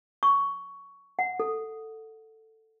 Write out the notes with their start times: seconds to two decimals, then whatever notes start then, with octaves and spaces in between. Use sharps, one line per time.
0.23 C#6
1.19 F#5
1.40 A4